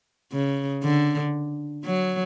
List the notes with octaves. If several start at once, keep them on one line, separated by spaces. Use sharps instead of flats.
C#3
D3
F#3